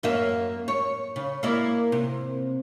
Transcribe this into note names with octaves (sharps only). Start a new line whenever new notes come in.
F#2 A#3 E5
C#5
C#3
A#3 E4 D5
C3